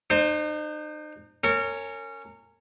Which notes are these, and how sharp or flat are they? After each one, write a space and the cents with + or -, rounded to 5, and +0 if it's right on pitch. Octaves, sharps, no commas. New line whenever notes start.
D#4 -40 C5 +0
C#4 +0 A#4 -30